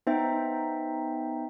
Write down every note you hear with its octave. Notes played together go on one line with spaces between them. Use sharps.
B3 D#4 C5 E5 G5